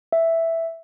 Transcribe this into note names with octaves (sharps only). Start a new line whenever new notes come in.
E5